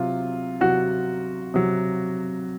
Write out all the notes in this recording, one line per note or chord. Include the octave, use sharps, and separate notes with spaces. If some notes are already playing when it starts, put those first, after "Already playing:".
Already playing: C3 F#3 F4
C3 F#3 F#4 F#5
C3 F#3